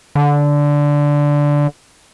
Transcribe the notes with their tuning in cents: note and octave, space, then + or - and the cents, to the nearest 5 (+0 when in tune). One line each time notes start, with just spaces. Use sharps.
D3 -10